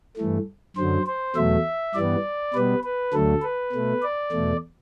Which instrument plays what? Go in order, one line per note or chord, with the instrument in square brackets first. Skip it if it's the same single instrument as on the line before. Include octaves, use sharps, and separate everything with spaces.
[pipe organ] G2 E3 A3
F#2 D3 F#3 C5
C5
E2 B2 F#3 A3 E5
G2 E3 G3 B3 D5
B2 G3 B3 B4
B4
D2 D3 F#3 A3 A4
B4
B2 A3
D5
E2 B2 A3